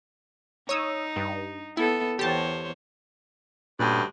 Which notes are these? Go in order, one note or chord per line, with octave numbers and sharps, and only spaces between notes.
D#4 C#5 D#6 E6
G2
B3 E4 A4
E2 G4 C5 C#5 A5
D2 G2 A#2 C#4